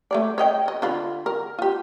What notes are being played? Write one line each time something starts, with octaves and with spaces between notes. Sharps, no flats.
A3 C#5 D5
C#5 D#5 G5
A4 D#5
D3 F4 B5
A#4
F4 G4